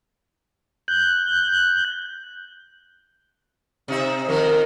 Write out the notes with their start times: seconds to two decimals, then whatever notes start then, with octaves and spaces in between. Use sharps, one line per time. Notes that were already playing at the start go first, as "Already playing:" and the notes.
0.88 F#6 G6
3.88 C3 D#4 E5
4.29 F2 D#3 A#4